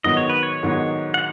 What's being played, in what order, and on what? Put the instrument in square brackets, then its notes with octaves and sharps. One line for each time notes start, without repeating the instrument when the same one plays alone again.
[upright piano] G#2 D#3 F#3 B3 D#4 [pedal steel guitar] D#5
[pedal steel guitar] C#5
B4
C#5
[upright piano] G#2 D#3 F#3 B3 D#4
[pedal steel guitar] F#5